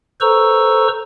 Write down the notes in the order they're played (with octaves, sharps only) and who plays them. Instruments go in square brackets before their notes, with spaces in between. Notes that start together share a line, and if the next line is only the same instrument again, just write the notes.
[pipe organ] A4 B4 C5 A#5 C#6 E6